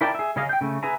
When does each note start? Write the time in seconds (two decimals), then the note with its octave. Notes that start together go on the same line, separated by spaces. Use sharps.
0.01 E4 A#4 D5 G5 A5
0.15 G#4 E5
0.36 C#3 C#4 G#4 D#5 F5
0.49 G5 G6
0.61 C#3 A3
0.83 G#4 B4 E5 G#5 A#5